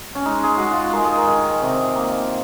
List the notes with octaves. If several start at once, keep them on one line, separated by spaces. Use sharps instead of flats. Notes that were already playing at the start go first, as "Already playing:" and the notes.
C#4
G#3 D#4
G#4
G#3 F#4
F4
G#3 A#4
G#4
A#4
D#3
C3
A#3